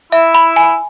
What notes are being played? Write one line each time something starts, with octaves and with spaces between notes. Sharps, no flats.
E4 E5
B5
G#5